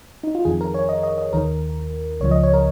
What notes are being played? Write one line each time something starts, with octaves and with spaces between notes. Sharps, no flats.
D#4
F4
F2 D#3 G#4
A#4
C#5
D#5
D#5
D#5
D#2 D#3 A#4
C#2 C#3 F3 C#5
D#5
C#5
A#4